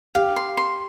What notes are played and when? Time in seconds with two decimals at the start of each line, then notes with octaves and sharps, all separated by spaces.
0.15 G4 F5
0.36 C6
0.57 C6